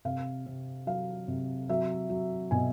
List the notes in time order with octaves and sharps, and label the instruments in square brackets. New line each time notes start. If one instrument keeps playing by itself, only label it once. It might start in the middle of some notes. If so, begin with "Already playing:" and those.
[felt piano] C3 F5
C3
F#3 F5
C3
F#3 E5
F#3
B2 G#5